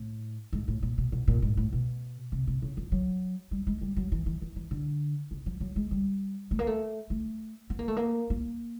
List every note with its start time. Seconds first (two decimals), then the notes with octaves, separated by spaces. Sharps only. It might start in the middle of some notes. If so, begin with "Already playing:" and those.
Already playing: A2
0.53 G#2
0.68 A2
0.83 A#2
0.98 B2
1.12 B2
1.28 A#2
1.42 G#2
1.57 A2
1.73 B2
2.32 C3
2.47 C3
2.62 C#3
2.77 F3
2.92 F#3
3.51 G3
3.67 G#3
3.81 G3
3.97 F#3
4.12 E3
4.26 E3
4.42 E3
4.56 E3
4.71 D3
5.31 C#3
5.46 F3
5.61 F#3
5.76 G#3
5.91 G3
6.51 A3
6.59 A#3
6.67 A3
7.10 A3
7.70 B3
7.79 A#3
7.88 A3
7.97 A#3
8.30 A#3